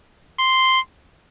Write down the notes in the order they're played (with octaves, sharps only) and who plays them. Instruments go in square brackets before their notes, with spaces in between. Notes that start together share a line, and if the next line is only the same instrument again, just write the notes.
[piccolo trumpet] C6